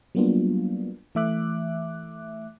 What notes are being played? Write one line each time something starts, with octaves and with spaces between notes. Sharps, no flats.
F#3 G3 A#3 B3 D4 F4
E3 A3 E5 D6 F#6